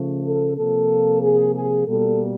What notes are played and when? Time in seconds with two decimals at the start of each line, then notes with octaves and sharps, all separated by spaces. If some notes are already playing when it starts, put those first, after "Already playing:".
Already playing: C#3 F3 A3
0.23 A4
0.55 C3 F3 A#3 A4
1.21 G#4
1.54 G#4
1.86 B2 G3 A#3 A4